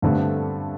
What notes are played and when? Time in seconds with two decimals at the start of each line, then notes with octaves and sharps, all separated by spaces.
0.02 G2 D3 A3 C4